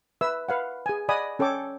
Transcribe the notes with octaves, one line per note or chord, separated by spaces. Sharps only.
B4 E5 E6
B4 F5 F#5
G#4 G#5
D5 D#5 F#5 G#5 B5 D#6
C#4 A4 C#5 G5 D6